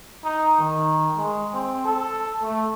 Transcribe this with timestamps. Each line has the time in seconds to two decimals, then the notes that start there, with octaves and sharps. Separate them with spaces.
0.24 D#4
0.59 D#3
1.17 G#3
1.54 C4
1.85 A4
2.42 A3